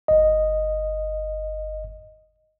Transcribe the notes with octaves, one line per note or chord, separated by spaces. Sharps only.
G1 D#5